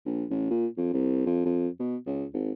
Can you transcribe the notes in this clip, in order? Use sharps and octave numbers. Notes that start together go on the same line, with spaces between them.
A#1
A1
A#2
F2
C2
F2
F2
B2
C#2
G#1